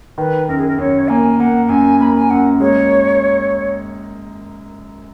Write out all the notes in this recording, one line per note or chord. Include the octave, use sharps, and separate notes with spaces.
D#3 B4
F#2 A#4
G#4
A#4
F#2 C#5
A#3 G#5
A#3 F#5
F#5
F#2 G#5
A#3 B5
G#5
F#2 F#5
G#3 C#5